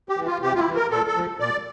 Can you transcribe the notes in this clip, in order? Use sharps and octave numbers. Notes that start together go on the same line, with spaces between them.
G4
E3
F4
C3 G4
F4
E4
E3
A#4
A#2 A4
A4
F3
A#2 D5